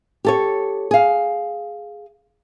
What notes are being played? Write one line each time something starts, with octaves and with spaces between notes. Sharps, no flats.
G4 A4 C#5
G#4 F5